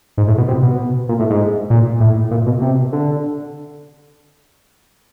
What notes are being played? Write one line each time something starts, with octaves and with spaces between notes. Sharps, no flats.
G#2
A2
B2
C3
B2
A#2
A2
G#2
A#2
A2
A#2
B2
C3
D3